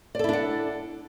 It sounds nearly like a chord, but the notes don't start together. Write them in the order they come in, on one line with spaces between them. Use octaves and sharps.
D5 A4 E4 D4 F#5